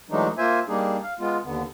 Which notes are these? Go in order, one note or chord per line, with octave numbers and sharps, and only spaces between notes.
E3 F#3 G#3 A3 D4 D#4
A#3 F4 C5 E5 G#5
G3 A#3 D4 D#4 G#4
F5
G#3 B3 F4
D#2 D3 B3